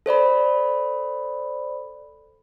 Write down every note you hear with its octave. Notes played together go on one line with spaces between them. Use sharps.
A4 C5 D5 B5